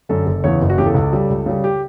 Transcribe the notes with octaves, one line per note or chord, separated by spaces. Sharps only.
F#2 D3 A4
F#1 A4
E2 C#3 E3 C#5
F#1
F#4
E2 C#3 E3 G4
A4
C#2
C#3 G3
C#2
C#3 G3
G4